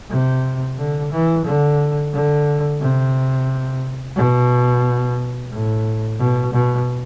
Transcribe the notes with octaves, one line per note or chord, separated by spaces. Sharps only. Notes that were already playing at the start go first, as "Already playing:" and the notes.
C3
D3
E3
D3
D3
C3
B2
A2
B2
B2